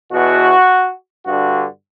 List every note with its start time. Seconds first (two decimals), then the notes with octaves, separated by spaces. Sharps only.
0.11 E2 B2 F#4
1.24 G2 D3 F#4